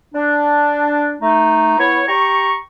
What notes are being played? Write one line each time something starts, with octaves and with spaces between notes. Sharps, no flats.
D4
A3 D#4
B3 E4 C#5
G4 A#5 C#6